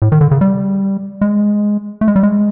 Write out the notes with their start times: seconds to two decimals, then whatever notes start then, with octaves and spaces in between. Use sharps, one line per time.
0.02 A2
0.12 D#3
0.21 D3
0.31 C#3
0.41 G3
1.21 G#3
2.01 A3
2.08 G#3
2.16 G3
2.23 G#3